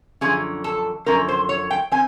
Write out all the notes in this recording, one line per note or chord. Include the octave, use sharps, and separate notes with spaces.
F#2 D3 F3 C#4 G#4
A4
F#2 D3 F3 C#4 A#4
C5
C#5
G5
C4 G#5